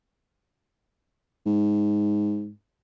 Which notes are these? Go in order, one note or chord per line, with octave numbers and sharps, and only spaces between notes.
G#2